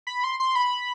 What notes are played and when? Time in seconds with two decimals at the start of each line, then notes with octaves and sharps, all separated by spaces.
0.07 B5
0.24 C6
0.40 C6
0.55 B5